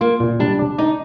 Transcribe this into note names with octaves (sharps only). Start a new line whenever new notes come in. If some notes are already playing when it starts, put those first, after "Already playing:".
A#3 F4
A#2
G3 D4
D4
D#4 D5